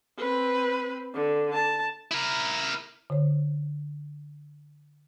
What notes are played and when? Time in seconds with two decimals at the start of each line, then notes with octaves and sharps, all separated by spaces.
0.19 C4 B4
1.14 D3
1.53 A5
2.11 E4 A#4
3.10 D3 C5 C#5